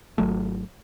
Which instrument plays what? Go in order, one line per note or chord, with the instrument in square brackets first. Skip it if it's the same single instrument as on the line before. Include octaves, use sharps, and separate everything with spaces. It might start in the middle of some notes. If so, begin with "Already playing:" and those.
[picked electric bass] G#1 F#3 A3